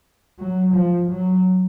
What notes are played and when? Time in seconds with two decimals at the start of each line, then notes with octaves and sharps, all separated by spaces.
0.39 F#3
0.74 F3
1.10 F#3